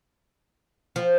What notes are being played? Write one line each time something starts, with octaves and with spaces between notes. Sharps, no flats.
F3